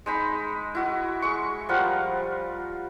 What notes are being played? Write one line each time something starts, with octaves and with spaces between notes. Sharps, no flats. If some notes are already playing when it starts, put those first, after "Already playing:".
G#3 D#4 B5
E4 F#4 D#6
G#3 C#6
F3 G3 A#4 F#5